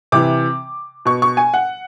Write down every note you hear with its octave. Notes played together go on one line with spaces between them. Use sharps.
C3 E3 D6
B2 C#6
C#6
G#5
F#5